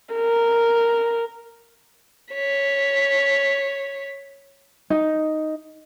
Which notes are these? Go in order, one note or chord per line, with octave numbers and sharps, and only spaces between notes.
A#4
C#5 B6
D#4